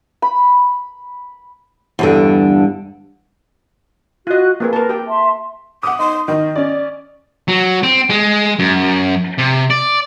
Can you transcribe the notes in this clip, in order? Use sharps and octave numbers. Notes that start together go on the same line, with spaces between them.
B5
E2 G2 D3
F4 F#4 D#5 F#6
A#3 C4 G#4 B4
A#4 A5
G4 G5
E5 A5 C6
F#5 D6 D#6
D#4 C6
D#3 D#5
C#4 D5
F#3
C4
G#3
F#2
C3
D5